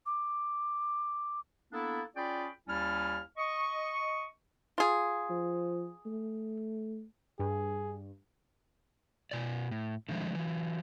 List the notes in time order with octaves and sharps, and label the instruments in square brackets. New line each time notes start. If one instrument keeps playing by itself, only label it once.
[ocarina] D6
[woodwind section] A#3 B3 D4 E4 A4
C#4 F4 G#4 D5 G5 B5
D#2 G3 C#4 E4 A5 F6
D#5 C#6
[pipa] F4 G#4
[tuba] F3
A3
[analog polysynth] G2 [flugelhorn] G#4
[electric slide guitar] B2 D5
A2
D3 D#3 F3 G#3 A3
E3 F#3